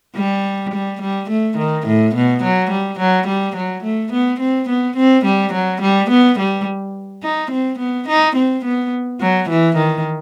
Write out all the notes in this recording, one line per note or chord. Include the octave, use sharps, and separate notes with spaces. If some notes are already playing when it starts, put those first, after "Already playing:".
G3
G3
G3
A3
D#3
A2
B2
F#3
G3
F#3
G3
F#3
A3
B3
C4
B3
C4
G3
F#3
G3
B3
G3
D#4
C4
B3
D#4
C4
B3
F#3
E3
D#3